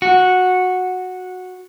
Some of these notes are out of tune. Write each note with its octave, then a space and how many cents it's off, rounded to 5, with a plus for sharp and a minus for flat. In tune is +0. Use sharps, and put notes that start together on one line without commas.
F#4 -10